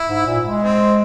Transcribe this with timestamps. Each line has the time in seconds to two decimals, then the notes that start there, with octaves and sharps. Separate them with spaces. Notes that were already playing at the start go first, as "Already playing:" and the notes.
Already playing: E4
0.09 G#2
0.26 A#2
0.44 G#3
0.62 C4